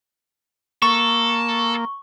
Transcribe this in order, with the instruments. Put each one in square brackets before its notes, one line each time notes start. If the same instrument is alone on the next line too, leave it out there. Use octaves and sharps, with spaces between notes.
[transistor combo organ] A#3 [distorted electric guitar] A4 [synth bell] C#6